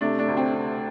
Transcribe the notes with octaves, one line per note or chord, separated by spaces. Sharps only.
C3 A3 D4
A3 D4
D2
C4
C3